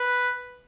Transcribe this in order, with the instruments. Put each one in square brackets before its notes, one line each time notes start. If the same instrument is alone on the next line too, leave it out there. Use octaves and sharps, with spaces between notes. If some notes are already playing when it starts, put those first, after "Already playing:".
Already playing: [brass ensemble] B4